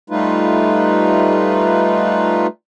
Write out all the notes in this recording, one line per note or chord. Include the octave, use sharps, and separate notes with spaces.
G3 A3 D#4 F4 B4